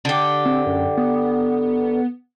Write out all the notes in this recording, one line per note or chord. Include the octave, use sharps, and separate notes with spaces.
D3 G4
C4
F#2
B3